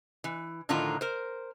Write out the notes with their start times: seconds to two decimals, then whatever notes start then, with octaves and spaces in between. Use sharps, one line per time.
0.24 E3
0.69 A2 D3 D#3 F3 F4 A#5
1.01 A#4 C5